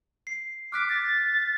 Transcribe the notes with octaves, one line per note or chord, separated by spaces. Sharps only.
C7
D6 F6 F#6 B6
A6